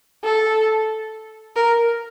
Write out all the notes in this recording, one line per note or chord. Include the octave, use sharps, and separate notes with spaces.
A4
A#4